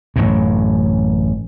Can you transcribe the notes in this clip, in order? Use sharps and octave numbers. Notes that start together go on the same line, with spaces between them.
A1 F#2 A2